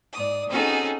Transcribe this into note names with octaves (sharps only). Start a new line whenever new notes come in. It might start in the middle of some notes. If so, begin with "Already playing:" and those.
G#2 D5 D#6
C4 C#4 D#4 F#4 G#4 A4